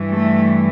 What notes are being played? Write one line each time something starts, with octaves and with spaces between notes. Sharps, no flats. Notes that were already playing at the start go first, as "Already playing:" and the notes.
Already playing: G2 E3
A3